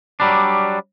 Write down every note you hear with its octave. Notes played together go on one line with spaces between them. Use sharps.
F#3 G3 D4